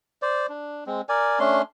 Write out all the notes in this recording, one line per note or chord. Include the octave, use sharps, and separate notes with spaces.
C5 D5
D4
G#3 C4
A#4 D5 G#5
A3 C#4 D4 C6